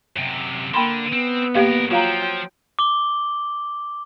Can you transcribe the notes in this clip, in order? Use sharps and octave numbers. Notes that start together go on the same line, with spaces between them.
F#2 C3
D3 A#3 G5 B5 C6
B3 C4
G2 A#3 G4 A#4 F5
F3 F#3 F4 F5 G5 A#5
D6 G7